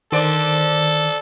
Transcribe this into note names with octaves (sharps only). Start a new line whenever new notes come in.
D3 D#3 A4 C5 D5